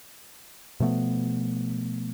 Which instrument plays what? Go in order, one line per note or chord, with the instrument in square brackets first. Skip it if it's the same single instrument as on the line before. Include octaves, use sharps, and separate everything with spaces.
[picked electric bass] B2 F3 A3 B3